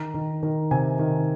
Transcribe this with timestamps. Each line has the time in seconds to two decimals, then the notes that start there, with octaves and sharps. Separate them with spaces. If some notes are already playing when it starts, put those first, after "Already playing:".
Already playing: D#3 A#5
0.14 D#3
0.43 D#3
0.71 C3 G#5
0.99 D#3